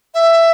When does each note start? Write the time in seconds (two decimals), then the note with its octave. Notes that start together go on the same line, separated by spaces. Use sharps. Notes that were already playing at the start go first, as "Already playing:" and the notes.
0.14 E5